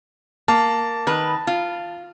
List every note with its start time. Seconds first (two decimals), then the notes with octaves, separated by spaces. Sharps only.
0.48 A#3 A5
1.07 D#3 B4
1.47 F4